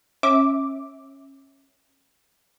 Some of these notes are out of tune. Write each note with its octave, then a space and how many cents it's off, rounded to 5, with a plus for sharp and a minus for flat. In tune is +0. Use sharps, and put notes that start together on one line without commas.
C#4 -25 E5 -15 D6 +0